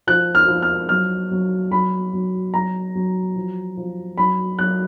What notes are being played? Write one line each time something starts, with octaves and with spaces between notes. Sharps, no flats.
F3 F#6
F6
F3
F6
F#3 F6
F#3
F#3 B5
F#3
F#3 A#5
F#3
F3
F3
F#3 B5
F#3 F#6